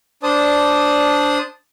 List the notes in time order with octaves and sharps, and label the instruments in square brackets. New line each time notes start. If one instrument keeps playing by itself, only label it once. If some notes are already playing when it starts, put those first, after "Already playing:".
[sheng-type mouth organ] D4 C5 D5 A5 D#6